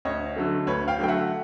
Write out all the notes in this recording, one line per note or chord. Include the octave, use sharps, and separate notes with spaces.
D2 C#5 D#5
D3 F#3 A3
D2 B4 C#5
F5 G5
D3 F#3 A3 G5
E5 F#5